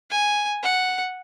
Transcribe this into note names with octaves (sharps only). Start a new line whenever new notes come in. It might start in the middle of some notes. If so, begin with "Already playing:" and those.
G#5
F#5